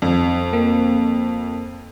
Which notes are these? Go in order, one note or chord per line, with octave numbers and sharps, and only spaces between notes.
F2
A#3